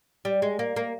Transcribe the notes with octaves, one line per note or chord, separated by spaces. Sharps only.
G3
G#3
A#3
A#3